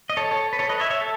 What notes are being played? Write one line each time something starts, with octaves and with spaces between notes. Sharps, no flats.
D#5
A4 C#5
A4 C#5
B4
A4 C#5
B4 D#5
C#5 E5
C#5 E5
A4